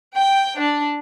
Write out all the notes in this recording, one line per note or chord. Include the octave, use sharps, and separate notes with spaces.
G5
D4